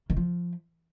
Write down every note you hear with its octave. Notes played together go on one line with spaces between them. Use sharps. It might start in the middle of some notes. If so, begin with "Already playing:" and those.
D#3
F3